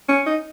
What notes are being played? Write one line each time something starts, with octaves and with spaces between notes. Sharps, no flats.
C#4
D#4